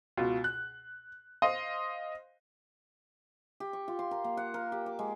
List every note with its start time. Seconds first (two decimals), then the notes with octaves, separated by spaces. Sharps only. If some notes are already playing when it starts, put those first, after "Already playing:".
0.17 C#2 B2 F4
0.44 F#6
1.42 C5 D#5 F5 C6
3.60 G4
3.73 C#6
3.88 F4
3.99 C6
4.11 A#4
4.24 A#3
4.37 F#5
4.54 A#4
4.72 G4
4.86 D6
4.99 G#3